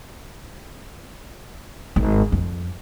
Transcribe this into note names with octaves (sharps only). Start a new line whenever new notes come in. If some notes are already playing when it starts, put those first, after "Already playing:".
G#1
F2